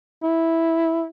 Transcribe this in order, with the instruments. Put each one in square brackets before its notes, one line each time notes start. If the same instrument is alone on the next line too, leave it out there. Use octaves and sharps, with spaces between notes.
[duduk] E4